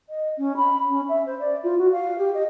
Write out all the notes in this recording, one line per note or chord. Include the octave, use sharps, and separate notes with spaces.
D#5
C#4
B5
C#4
E5
C5
D5
F4
F#4
F5
G4
D#5